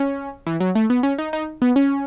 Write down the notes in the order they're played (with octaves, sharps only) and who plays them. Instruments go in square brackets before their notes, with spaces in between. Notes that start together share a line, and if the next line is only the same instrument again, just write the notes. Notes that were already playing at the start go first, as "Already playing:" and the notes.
Already playing: [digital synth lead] C#4
E3
F#3
A3
B3
C#4
D#4
D#4
B3
C#4